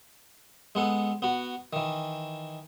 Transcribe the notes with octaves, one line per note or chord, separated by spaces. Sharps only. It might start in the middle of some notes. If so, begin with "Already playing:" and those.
G#3 B3 A4
B3 F#4
D#3 E3